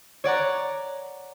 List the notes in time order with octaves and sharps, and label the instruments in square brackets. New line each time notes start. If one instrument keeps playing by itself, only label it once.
[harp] C#5 D5 F#5 A#5